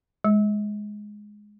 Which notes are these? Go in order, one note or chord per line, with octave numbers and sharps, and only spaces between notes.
G#3